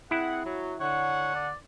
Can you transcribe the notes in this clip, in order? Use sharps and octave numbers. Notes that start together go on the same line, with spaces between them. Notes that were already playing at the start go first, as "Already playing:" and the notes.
C4 E4 G#4 F#5
F#3
D3 C#5 F#5
D5